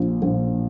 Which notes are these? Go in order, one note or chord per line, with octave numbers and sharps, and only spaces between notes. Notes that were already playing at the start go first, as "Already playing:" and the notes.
Already playing: A#1 A#2
A#1